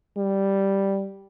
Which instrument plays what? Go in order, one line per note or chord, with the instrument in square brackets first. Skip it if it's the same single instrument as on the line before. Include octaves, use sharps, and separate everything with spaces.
[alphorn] G3